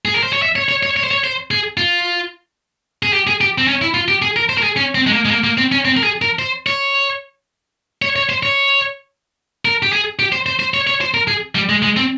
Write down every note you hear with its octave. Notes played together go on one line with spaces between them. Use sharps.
G#4
A#4
C5
C#5
E5
C#5
C#5
C#5
C#5
C5
C#5
C5
G#4
F4
G#4
G4
G#4
G4
C4
C#4
E4
F4
G4
G#4
A#4
C5
A#4
G#4
C#4
C4
G#3
A#3
G#3
A#3
A#3
C4
C#4
C4
A#4
G#4
A#4
C5
C#5
C#5
C#5
C5
C#5
A#4
G4
G#4
G4
C5
C5
C5
C#5
C#5
C5
A#4
G#4
G3
G#3
G#3
C4